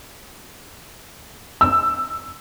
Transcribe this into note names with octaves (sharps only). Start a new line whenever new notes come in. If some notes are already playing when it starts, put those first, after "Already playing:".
E6